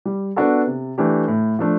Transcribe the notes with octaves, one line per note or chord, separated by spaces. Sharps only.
G3
B3 D4 F#4 A4
C3
E3 A3 D4 G4
A2
F3 A3 D4